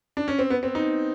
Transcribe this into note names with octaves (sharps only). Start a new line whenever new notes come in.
D4
C#4
C4
B3
C4
D#4